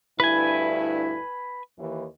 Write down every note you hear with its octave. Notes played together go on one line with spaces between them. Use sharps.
D2 G2 E4 B4 G#5
D#2 E3